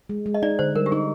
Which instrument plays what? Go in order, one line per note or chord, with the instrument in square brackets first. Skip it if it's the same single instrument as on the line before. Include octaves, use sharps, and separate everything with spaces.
[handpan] G#3
G#3
[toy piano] D#5
[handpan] D#4 [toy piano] D5
[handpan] D3 [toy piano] C5
[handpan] G3 [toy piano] A#4
[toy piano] G4
[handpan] D#4 [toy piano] G#4